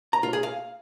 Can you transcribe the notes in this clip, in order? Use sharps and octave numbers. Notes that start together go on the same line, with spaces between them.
A#5
F4
G#4
F5